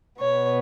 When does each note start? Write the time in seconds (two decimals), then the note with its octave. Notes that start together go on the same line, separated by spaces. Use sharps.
0.19 B2 B3 C#5